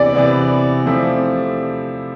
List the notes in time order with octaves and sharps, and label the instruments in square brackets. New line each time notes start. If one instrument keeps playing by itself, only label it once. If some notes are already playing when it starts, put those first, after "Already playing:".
Already playing: [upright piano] C3 E3 B3 [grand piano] D5
[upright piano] C3 E3 B3
C3 F3 A3 C4 E4